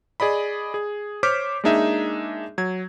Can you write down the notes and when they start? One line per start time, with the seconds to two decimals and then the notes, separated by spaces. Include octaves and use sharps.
0.20 G#4 D5 D#5 B5
0.74 G#4
1.23 C5 C#5 D6 F6 G6 B6
1.64 G#3 A#3 D4 D#4 G#4 E5
2.58 F#3 G#6